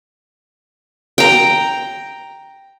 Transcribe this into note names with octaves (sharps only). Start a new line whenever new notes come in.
G5 A#5